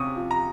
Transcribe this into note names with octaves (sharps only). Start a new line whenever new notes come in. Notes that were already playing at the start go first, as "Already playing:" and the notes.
Already playing: C3 C#4 C#6 D#6
F3
A#5